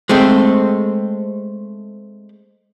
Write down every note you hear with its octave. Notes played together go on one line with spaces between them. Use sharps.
G#3 A3 C4